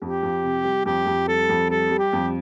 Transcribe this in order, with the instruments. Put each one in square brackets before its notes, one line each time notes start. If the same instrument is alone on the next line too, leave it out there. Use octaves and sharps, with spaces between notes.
[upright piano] F2 [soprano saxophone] G4
[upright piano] F2
C3
G3
[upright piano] F2 [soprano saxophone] G4
[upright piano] F2
[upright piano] G3 [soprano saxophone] A4
[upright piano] F2
[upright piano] G3 [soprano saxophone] A4
[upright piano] G3
[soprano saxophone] G4
[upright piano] F2